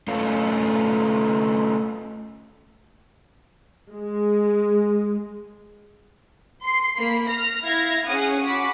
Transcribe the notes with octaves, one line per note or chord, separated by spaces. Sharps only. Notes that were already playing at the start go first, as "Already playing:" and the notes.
A3 C#4 F4
G#3
C6 C7
A#3 B5
F6 A#6
E4 F5 G#6 A#6
C#4 G#4 F5 F#5 D#6
F#4 B5 D6